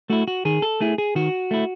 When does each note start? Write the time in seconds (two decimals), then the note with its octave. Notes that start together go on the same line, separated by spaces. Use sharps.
0.10 A3 E4 F#4
0.28 F#4
0.45 D#3 G#4
0.62 A4
0.80 A3 E4 G#4
0.98 G#4
1.15 D#3 F#4
1.51 A3 E4